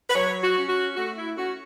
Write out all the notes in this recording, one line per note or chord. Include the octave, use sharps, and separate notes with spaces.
B4
F#3 C#5
F#4
C#4
F#4
A3 F#4
E4
C#4 F#4